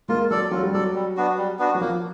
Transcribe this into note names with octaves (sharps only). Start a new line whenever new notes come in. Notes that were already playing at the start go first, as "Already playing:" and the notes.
G#3 A#3 F4
F#3 A4 D5
F#3 F4
G3
F#3 A4 D5
G3
B3 D4 F#4
G3
B3 D4 F#4
F#3
F3 A#3